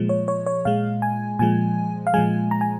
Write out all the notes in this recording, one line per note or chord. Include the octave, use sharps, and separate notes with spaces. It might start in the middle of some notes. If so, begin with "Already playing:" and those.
Already playing: A#2 F3 G#3
C#5
C#5
C#5
A#2 G#3 F5
G#5
A#2 F3 G#3 G#5
F5
A#2 F3 G#3 G#5
A#5
G#5